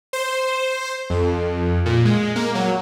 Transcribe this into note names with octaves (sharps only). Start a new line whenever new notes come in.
C5
F2
A#2
G#3
A#3
F#3